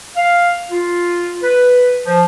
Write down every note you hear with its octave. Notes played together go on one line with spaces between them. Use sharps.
F5
F4
B4
F3